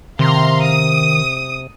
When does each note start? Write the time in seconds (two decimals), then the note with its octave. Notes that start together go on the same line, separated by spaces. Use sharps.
0.19 C3 D#3 F5 A#5 C6
0.66 D#6